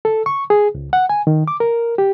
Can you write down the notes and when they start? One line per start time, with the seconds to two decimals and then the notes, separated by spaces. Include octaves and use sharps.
0.05 A4
0.26 C#6
0.50 G#4
0.75 C#2
0.93 F#5
1.09 G#5
1.27 D#3
1.48 D6
1.60 A#4
1.98 G4